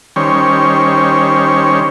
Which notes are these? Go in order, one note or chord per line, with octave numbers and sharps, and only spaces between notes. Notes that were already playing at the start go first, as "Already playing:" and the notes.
D#3 G3 C#4 C5 C#5